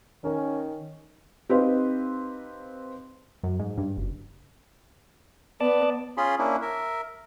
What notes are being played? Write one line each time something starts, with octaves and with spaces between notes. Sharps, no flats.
D#3 C#4 A#4
C4 D#4 G4 B4 D#5 F5
F#2
G#2
G2
F#1
B3 D5 A5
C#4 F4 G#4 B5 C6
A#3 C#4 D4 E4
A#4 E5